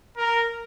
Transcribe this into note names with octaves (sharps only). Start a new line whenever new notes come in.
A#4